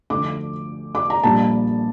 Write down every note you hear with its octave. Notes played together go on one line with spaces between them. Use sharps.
D2 D3 F3 D6
D6
A#5
A#1 A#2 G3 A5